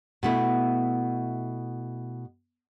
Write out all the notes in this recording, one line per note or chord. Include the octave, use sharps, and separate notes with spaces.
B2 A3 E4